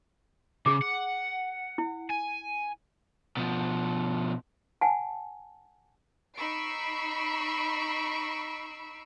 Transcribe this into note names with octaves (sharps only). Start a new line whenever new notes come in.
C#3 G#4 D6
F#5
E4
G#5
B2 F3
F#5 G#5 A5
D#4 B5 C#6 E6 C7 D7